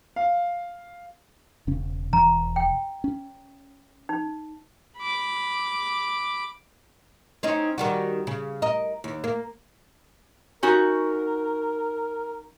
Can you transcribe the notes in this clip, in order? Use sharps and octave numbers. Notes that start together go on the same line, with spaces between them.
F5
E1 C#3 C#4
E1 E3 A#5
G5
C#4
D#4
B5 D6
C4 C#4 D#4
D#3 G3 F#4
C#3
A#4 D#5
D#2
A#3
C#4 D#4 F#4 A#4